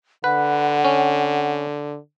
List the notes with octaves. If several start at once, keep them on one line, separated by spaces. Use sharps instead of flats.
D3 B4 F#5
C#4